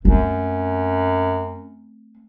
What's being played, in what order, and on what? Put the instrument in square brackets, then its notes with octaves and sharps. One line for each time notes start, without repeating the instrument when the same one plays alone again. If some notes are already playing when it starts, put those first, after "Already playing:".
[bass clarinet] F#2 [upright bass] A3 C4